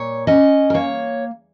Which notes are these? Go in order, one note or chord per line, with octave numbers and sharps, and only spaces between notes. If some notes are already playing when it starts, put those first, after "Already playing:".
Already playing: A#2 C#5
C#4 D#5
A#4
A#3 C#5